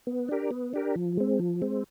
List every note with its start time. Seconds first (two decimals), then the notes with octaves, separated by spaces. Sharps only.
0.07 B3
0.29 D4 G4 A#4
0.51 B3
0.74 D4 G4 A#4
0.96 F3
1.17 G#3 C4
1.39 F3
1.62 G#3 C4